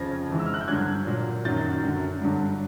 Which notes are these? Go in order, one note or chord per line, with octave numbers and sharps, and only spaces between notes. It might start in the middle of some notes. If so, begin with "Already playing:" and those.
Already playing: F2 C#3 F3 G#6 A#6
G#2 E3
E6
F6
F#6
G6
G2 D3 F#3 F#6 G#6
A#2 F#3
F#2 D#3 F#3 G6 A6
F#2 D3 F#3
G2 D3 F#3